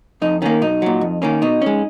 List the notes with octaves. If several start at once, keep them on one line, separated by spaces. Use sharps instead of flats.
F2 D#4
D#3 A#3 C#4
B1 D#4
A#2 F#3
F2
D#3 A#3 C#4
B2 D#4
G#3 C#4